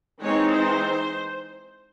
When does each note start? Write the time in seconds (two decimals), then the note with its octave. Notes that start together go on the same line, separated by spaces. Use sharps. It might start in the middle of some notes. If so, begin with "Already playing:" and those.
0.21 E3 G#3 C4 D#4 C#5
0.51 C5